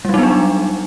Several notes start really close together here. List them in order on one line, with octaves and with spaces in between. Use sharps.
G3 F#3 D#4 B3 D4